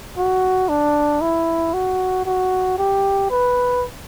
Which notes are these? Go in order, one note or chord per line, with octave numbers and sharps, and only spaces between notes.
F#4
D4
E4
F#4
F#4
G4
B4